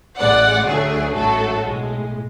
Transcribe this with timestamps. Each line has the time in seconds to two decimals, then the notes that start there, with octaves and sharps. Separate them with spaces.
0.18 A1 A2 G#3 D5 F#5
0.67 D2 D3 F#3 A3 G#4
1.15 A1 G#2 F#3 A3 F#4 A4
1.64 B1 A2 G#3